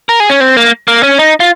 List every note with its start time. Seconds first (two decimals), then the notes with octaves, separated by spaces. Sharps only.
0.09 A#4
0.20 G#4
0.30 C#4
0.41 C4
0.57 A#3
0.88 A#3
1.03 C#4
1.18 D#4
1.40 F4